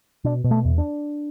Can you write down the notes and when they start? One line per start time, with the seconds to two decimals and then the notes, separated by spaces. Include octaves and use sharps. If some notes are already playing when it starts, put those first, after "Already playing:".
0.24 B2 D4
0.44 B2
0.51 A3
0.65 E2
0.78 D4